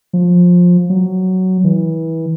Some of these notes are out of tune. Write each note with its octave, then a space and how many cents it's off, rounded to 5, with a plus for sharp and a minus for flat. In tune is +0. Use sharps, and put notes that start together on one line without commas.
F3 +20
F#3 +10
E3 -25